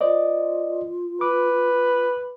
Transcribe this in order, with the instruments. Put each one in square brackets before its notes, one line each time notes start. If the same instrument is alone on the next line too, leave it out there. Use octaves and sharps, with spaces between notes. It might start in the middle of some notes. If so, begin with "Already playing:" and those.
[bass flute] F4 [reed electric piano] C5 D5 D#5
[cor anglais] B4 [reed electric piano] D6